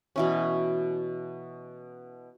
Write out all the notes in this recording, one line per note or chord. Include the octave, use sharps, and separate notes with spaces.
B2 E3 C#4